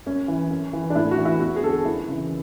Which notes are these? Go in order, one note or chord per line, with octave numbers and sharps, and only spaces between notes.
F#2 C#4
E3
F#2
E3
D4
A2 E4
F#4
E3
E4
E2 F#4
G#4
D3 A4
G#4
F#2 E4
C#3 E3